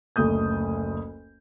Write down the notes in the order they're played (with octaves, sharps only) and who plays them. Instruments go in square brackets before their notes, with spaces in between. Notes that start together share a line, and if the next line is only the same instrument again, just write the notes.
[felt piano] F#1 D2 A3 D#6 G6